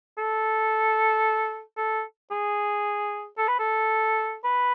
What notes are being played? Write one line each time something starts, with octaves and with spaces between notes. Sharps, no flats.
A4
A4
G#4
A4
B4
A4
B4